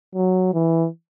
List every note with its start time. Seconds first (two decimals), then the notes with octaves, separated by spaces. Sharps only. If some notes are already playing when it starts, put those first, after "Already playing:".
0.15 F#3
0.53 E3